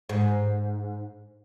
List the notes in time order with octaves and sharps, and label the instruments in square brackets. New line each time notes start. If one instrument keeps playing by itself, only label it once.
[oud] G#2